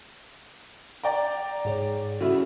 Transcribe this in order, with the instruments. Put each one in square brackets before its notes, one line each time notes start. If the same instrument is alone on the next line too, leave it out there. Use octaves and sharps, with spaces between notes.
[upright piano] D5 G5 A#5
[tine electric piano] G#2 G#4 C#5
[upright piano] C#3 E4 [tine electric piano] F#4 A4